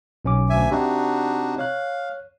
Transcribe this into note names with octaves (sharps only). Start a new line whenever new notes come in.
B1 C#4 D6
D2 E5 G#5
C3 C4 D4 D#4 F#4
C#5 F5 F#6